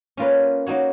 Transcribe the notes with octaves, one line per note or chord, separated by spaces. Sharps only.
A#3 C#4 F4 B4
A#3 D#4 F#4 C#5